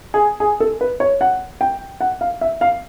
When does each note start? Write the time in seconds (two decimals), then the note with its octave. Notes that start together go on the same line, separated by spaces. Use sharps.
0.14 G#4
0.40 G#4
0.60 A4
0.81 B4
1.00 C#5
1.21 F#5
1.61 G5
2.01 F#5
2.21 F5
2.41 E5
2.61 F5